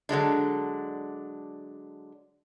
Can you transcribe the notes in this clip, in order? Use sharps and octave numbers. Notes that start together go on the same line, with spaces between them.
D3 F#3 G#3 D4